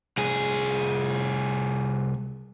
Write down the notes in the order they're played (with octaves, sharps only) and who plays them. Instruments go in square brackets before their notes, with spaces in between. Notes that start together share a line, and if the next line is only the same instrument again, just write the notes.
[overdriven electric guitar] C2 G#4